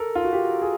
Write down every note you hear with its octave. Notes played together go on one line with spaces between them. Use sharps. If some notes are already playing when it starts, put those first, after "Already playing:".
Already playing: A4 A#4
F4
F#4
G4
G#4